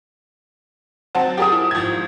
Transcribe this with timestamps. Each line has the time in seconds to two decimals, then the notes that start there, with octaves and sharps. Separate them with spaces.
1.15 F#3 C4 F#4 C5 A5
1.37 G4 G#4 A#4 A5 D#6
1.52 E4
1.71 G#1 F3 G#6